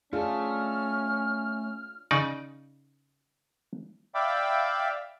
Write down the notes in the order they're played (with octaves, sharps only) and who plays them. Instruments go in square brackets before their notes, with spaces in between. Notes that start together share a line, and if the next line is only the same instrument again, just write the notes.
[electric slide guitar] A3 A5 [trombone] C#4 [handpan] D4 F4 G#4 [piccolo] F6
[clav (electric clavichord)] C#3 D#4 D5
[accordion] D5 E5 F5 G5 B5 D6